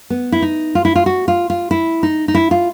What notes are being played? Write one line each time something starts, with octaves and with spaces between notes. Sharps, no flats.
B3
E4
D#4
F4
E4
F4
F#4
F4
F4
E4
D#4
D#4
E4
F4